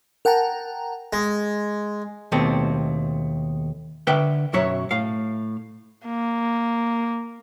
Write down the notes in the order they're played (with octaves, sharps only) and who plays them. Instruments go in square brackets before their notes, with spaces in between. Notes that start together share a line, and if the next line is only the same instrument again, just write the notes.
[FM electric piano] A#4 F#5 G5 A5 A#5
[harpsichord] G#3
[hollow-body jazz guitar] D#2 B2 A3 C4
D3 B4 E5 F#5 G5
B1 F#2 F#3 C#5 E5
A2 F5
[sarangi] A#3